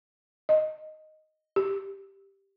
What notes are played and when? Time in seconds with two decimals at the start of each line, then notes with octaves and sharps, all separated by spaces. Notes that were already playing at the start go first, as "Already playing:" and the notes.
0.49 D#5
1.56 G4